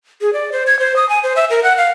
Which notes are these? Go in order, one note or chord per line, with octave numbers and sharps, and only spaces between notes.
G#4
D5
C5
G#6
C5
D#6
G#5
C5
E5
A#4
F#5
F5